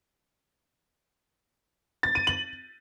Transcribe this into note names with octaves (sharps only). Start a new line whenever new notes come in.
A6
D#7
F#7